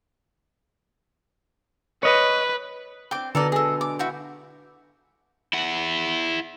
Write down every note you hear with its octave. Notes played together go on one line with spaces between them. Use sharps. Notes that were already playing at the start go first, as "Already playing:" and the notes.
B4 C#5 D#5
C4 D4 G5 C6 D6
B2 D3 D4 A4 A#4 D5 D#5
G#3 G#4 A4
D6
E4 F#4 G5
E4 F#5